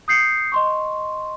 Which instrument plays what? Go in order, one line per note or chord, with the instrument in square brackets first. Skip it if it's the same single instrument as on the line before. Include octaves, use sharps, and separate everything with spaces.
[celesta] D#6 G6 C7 C#7
D#5 C6 C#6